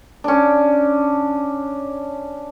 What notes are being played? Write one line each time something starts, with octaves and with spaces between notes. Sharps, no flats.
C#4 D4